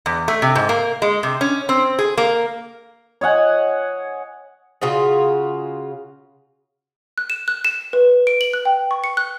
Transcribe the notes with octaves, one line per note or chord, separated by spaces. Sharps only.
E2
A3
C3
G#2
A#3
G#3
C3
C#4
C4
G#4
A#3
C#5 D#5 F#5 G#5
C#3 F4 F#4 G#4
F#6
E7
F#6
E7
B4
D7
F#7
F#6
G5
C#6
C#7
F#6